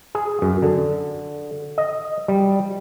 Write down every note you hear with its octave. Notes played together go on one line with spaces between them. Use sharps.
G#4
F#2
D3
D#5
G3